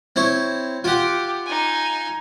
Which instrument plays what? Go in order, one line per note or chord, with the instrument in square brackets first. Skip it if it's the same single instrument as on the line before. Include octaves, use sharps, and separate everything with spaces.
[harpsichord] C4 E4 C#5
[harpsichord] F4 F#5 [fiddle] G4
[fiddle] D#4 G#5